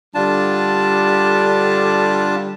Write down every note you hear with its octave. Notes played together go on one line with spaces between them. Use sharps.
D3 G3 D4 F4 A5